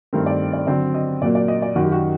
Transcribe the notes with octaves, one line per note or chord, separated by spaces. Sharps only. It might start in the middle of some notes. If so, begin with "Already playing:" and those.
G2 D#3 A3 C4 A#4
D5
D5
D3 F#3 C4 D5
D#5
A#2 F#3 A#3 D5
D5
D#5
D5
F#2 D#3 F#3 F#4
G4
F#4